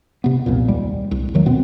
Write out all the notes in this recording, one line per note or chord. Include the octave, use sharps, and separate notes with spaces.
C3 B3
C2 F2 A#2
D#2 G3 G#3
C2
E2 D#3 F#3 A3
B2 B3 C4